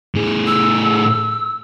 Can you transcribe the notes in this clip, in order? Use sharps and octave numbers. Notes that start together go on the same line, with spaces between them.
A2 G#4
E6